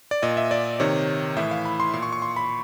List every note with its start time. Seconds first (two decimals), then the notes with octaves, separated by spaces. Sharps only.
0.11 D5
0.22 A#2 D#5
0.37 E5
0.51 D5
0.80 C3 D#3 C#5
1.36 A2 E3 E5
1.51 F5
1.65 B5
1.80 C6
1.94 A#2 C6
2.02 C#6
2.12 C#6
2.22 C6
2.36 B5